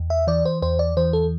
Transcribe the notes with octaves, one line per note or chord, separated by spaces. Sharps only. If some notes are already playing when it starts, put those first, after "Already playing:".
Already playing: E2
E5
E3 D5
C5
E2 C5
D5
E3 C5
A4